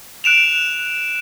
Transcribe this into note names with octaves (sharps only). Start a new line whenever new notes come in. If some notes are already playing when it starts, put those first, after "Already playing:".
F#6 D7 E7 F7